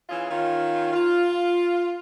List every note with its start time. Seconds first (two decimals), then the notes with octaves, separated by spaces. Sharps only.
0.09 E3 C#4 F4 G#4
0.29 D#3 C#4 F4
0.92 F4